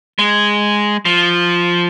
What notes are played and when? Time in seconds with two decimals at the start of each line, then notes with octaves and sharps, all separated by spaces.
0.19 G#3
1.05 F3